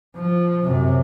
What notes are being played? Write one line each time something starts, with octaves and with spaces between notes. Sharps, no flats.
F3
F#2 C3